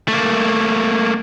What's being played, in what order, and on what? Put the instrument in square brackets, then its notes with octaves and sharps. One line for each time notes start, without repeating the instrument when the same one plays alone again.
[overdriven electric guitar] A3 A#3